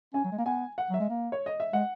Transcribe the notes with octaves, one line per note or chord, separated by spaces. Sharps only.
C#4 G#5
F#3
G#3
A#3
B3 G#5
F#5
F#3 E5
G#3
A#3
C#5
D#5
E5
G#3 F#5